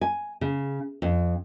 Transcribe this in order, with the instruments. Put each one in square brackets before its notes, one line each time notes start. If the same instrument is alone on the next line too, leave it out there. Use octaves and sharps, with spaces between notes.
[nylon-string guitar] G#5
C#3
F2